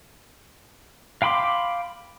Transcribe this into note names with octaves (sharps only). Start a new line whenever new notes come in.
F5 G5 B5 C6 D6